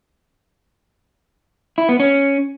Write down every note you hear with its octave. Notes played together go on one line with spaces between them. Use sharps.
E4
B3
C#4